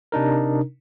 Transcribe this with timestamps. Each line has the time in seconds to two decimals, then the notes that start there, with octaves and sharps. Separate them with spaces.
0.12 C3 D4 D#4 A#4